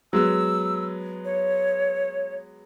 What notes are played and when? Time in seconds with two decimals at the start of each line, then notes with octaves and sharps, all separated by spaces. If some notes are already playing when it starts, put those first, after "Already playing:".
0.13 F#3 G#3 B3 E6
1.25 C#5